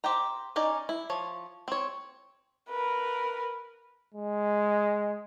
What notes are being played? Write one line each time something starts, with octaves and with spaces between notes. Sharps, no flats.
G4 C5 G5 A#5
C#4 D#4 D5 G#5
E4
F3 C#5
C4 C#5
A#4 B4
G#3